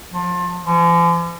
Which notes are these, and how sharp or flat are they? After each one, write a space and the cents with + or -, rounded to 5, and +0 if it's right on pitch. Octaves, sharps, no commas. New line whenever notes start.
F3 +30
F3 -45